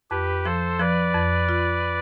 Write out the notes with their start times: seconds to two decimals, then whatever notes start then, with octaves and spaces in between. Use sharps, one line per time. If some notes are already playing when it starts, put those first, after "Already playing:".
0.10 F2 G4 B4
0.45 F3 A4 C5
0.79 F3 B4 D5
1.14 F2
1.49 F4